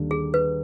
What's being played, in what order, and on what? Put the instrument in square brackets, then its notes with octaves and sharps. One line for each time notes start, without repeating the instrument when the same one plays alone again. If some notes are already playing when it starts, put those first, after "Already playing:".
Already playing: [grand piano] D#2 D3 G3 D4
[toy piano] G#4
B4